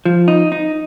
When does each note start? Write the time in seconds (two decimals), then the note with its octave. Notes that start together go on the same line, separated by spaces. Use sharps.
0.05 F3
0.28 D#4
0.52 D#4